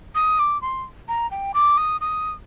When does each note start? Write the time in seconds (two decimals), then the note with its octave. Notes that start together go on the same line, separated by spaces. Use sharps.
0.15 D#6
0.39 D6
0.62 C6
1.08 A#5
1.31 G5
1.54 D6
1.77 D#6
2.01 D#6